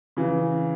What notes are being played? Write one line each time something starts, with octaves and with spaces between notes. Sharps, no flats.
C#3 E3